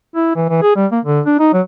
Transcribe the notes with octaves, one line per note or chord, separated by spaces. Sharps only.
E4
E3
E3
G#4
G3
A#3
D3
D4
D#4
F#3